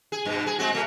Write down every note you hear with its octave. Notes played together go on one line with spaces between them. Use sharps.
G#4
G2 B2
G#4
G#3 C4 F#4
B2 A3